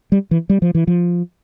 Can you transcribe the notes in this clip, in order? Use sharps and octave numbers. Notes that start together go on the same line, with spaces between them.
G3
E3
G3
F3
E3
F3